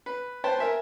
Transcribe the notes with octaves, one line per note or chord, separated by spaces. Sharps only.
B4
B4 C5 G5 A5 C6
A#4 E5 G#5